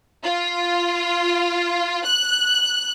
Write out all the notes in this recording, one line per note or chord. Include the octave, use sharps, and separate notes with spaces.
F4
F#6